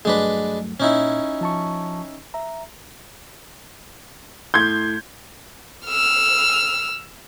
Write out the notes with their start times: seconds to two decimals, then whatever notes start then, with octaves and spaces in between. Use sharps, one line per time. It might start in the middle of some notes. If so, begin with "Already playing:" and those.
0.05 G2 F#3 G#3 A3 D4 B4
0.80 A#2 C#4 D#4 E4
1.41 F3 A5 C#6
2.34 E5 A#5
4.54 A2 C6 G6 G#6
5.86 E6 F6